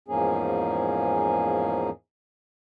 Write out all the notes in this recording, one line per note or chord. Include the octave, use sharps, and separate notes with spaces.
E2 G#2 F3 A#3 C#4 G#4